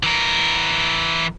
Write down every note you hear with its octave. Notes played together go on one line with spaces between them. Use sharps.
E3 A#4